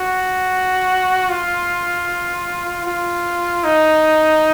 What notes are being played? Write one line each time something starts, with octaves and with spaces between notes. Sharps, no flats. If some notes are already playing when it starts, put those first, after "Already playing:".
Already playing: F#4
F4
F4
D#4